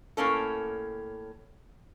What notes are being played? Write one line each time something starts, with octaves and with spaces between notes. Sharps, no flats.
A2 A#3 C#4 A4